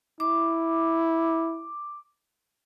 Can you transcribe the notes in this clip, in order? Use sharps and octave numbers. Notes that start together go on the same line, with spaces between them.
E4 D6